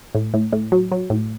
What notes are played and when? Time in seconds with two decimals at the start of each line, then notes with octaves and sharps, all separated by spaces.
0.15 A2
0.34 A2
0.53 A2
0.72 F#3
0.92 F#3
1.10 A2